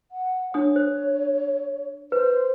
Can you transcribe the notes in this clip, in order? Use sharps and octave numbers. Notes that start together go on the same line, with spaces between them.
F#5
D4 C#5 D#6
C5
B4 C5